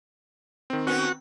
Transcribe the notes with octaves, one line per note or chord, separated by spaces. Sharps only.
D#3 C4
B3 C#4 F#4